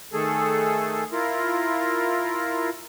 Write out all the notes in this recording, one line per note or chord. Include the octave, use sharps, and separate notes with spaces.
D#3 A3 G#4 A4
E4 F4 A#4